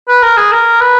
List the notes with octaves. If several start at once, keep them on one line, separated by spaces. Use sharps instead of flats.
B4
A#4
G#4
A#4
B4